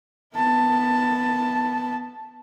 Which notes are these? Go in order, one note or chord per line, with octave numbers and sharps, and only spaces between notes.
B3 A5